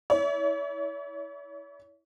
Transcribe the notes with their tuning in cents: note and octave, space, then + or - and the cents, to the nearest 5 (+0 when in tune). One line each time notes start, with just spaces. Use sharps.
E4 -25 C#5 +40